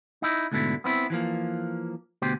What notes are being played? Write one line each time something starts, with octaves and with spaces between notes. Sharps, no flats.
D#4 E4
D2 G#2 B2 D3 E4
B3 C4 E4
E3 F3 A#3
D2 B2 G4 C5